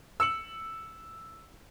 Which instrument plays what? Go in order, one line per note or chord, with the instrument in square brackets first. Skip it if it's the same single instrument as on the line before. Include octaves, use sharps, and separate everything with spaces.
[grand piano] E6 C#7 F#7